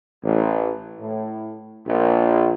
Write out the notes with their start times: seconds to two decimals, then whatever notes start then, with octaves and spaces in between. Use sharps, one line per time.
0.23 A1
0.99 A2
1.87 A#1